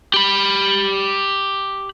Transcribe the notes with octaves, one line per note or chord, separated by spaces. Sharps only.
G4 B5